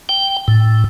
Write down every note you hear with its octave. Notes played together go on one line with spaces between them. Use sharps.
G5
A2